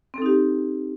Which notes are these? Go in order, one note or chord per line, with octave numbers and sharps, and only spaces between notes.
C4 D#4 G4 A4